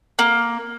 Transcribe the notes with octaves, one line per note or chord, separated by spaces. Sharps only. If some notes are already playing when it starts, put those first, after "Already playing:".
A#3